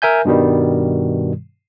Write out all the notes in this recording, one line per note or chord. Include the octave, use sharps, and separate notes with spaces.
A#4 E5 G#5 G6
G2 B2 D#3 G3